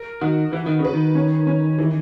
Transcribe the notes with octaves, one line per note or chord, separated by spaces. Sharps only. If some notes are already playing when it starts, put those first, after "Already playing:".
Already playing: A#4
D#3 F#4
E3 B4
D#3
C#3
B4
D#3
C#4
C#4
E3